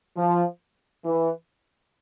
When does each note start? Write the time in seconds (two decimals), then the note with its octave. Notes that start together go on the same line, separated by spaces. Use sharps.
0.17 F3
1.05 E3